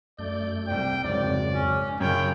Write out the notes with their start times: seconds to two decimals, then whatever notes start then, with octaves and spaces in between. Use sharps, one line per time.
0.19 F#2 A3 D5 G6
0.67 C2 D5 G5
1.04 G#1 F2 C#3 F#3 D5
1.53 C#4
2.00 F#2 C#3 C#5 G5 B5